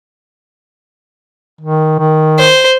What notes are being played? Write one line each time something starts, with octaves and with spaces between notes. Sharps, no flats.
D#3
D#3
C5